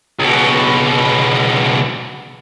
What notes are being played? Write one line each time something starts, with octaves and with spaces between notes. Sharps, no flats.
C#2 B2